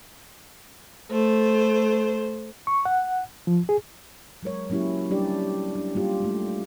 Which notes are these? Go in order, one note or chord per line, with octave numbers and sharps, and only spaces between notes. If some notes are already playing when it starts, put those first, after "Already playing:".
A3 C5
C#6
F#5
F3
G#4
F#3 G#3 A#4 C#5
F#3 A#3 C#4 E4 G4
G3 D4 G4 D5
D4
G3 A#3 F4 G4
G#3 A3